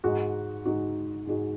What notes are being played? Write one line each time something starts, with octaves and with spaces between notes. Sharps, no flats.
G#2 G#3 D#4 F#4
G#2 G#3 D#4 F#4
G#2 G#3 D#4 F#4